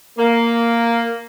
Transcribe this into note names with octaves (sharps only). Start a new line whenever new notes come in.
A#3